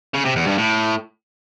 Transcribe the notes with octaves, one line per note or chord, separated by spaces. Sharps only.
C#3
C3
E2
G2
A2